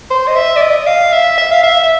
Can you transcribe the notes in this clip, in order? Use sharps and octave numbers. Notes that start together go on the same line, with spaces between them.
C5
D#5
E5
D5
D#5
F5
E5
E5
F5
E5
E5